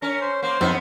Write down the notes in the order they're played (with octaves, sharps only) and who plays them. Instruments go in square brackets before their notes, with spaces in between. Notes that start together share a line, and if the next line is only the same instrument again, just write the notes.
[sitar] C#4 [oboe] A#4
[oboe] C5
[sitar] A#3 [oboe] C5
[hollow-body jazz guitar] F2 [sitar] B3 D#4